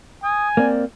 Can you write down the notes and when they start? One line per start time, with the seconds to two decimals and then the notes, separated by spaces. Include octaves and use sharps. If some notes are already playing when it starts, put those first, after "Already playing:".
0.23 G#5 D#6
0.57 A#3 C4 D5